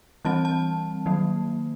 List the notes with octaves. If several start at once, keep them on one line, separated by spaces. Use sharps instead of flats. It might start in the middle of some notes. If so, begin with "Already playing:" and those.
E3 G3 C4 A5
A5
D#3 F#3 A#3